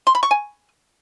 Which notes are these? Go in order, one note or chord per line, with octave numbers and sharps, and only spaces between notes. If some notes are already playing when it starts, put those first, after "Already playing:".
C6
B5
C#6
G#5